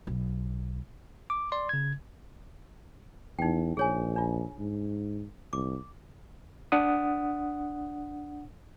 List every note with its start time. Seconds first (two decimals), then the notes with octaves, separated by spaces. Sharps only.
0.07 B1
1.30 D6
1.52 D5 C6
1.69 C#3 G#6
3.39 E2 D#4 G5
3.77 A#1 G#4 C#5 G#5
4.16 D4 F4
4.59 G#2
5.53 C2 D6
6.72 D4 F#5 D#6